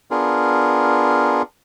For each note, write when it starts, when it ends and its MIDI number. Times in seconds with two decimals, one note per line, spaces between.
0.11 1.42 59
0.11 1.42 62
0.11 1.42 65
0.11 1.42 68
0.11 1.42 70